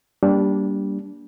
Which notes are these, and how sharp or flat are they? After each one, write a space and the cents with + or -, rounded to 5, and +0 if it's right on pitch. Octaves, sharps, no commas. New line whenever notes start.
G3 +0 A#3 +10 D4 -20